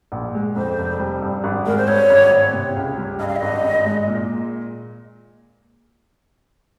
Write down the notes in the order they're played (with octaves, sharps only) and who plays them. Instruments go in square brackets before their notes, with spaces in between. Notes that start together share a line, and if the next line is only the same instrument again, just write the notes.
[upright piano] A#1
G#3
[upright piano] F2 [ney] C5
[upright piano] F1
G3
G2
G#1
[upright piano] G#3 [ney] A#4
[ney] C5
[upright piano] G2 [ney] C#5
[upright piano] G#1
C4
C3
C#2
G3
[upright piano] G2 [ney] D#5
[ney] F5
D#5
[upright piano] G#1
G#1
G#3
A#2